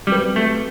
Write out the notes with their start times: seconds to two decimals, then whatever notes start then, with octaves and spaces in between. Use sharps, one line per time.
0.07 F#3 G3 C4 G4 B4
0.36 A3